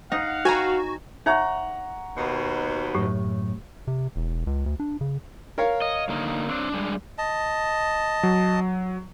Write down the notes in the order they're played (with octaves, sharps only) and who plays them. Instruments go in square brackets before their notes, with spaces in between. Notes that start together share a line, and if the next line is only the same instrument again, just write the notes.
[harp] D#4 [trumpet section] F5 F#5
[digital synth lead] F#4 [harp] G#5 A#5
[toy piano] D#4 C#5 E5 [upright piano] F#5 A#5 C#6
[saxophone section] D#2 B2
[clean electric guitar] F#2 A2 [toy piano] G4
[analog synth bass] C3
E1
C#2
D2
D4
C#3
[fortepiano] A#4 C#5 F5
[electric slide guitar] D#5
D3 A#3 D#4
C4 D4
G3 G#3 D4
[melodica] D#5 A5
[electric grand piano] F#3